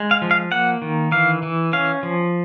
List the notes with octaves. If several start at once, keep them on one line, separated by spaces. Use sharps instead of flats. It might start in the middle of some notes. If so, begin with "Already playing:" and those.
Already playing: G#3
F5
F3
F5
A#3 F#5
D#3
E3 F5
E3
C#4 F5
F3